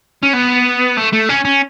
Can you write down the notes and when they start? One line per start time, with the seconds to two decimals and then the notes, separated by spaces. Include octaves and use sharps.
0.23 C#4
0.33 B3
0.97 A3
1.13 A3
1.29 C#4
1.45 C#4